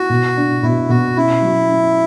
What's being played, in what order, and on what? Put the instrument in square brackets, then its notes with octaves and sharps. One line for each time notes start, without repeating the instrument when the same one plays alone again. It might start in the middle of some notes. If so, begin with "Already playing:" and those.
Already playing: [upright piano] E4 [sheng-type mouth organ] F#4
[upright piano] B2
D4
[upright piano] B2 [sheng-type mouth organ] E4
[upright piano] B2 [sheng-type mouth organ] F#4
[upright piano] C#4 [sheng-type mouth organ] E4
[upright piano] F#3
C#4